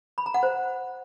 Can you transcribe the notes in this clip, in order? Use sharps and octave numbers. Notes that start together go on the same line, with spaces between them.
B5
A#5
F#5
C5